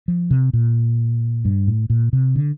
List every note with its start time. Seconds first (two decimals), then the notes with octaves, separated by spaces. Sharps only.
0.08 F3
0.31 C3
0.53 A#2
1.45 G2
1.67 A2
1.90 A#2
2.13 C3
2.35 D3